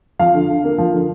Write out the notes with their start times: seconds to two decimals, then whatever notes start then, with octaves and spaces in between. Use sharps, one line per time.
0.19 F3 F5
0.34 D3
0.49 D3
0.64 A#3
0.78 F3
0.93 D3